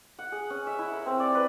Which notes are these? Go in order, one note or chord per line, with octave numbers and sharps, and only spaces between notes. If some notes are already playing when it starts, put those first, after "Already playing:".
F#5
G#4
C#4
E5
E4
A#4
C4
D5
B4